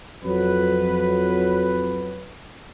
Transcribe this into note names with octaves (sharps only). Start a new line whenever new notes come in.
F2 F#3 B4